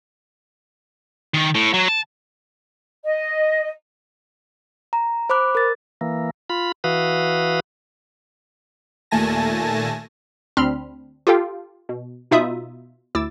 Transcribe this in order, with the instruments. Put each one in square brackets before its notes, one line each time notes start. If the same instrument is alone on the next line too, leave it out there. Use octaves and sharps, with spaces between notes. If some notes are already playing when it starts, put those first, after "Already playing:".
[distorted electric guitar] D#3
A2
F#3
A5
[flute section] D#5
[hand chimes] A#5
C5 B5 D6 F#6
A#4 A6
[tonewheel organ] E3 A#3
F4 B5
E3 F#4 B4 F5 D#6
[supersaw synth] D#2 A#2 A3 G#5 A5 A#6
[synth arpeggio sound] D2 C4 D4 B5 C6 F6
F4 G4 A4 F5 G5
B2
B2 D#4 F4 E5 B5 D#6
D2 E4 D6 E6 A6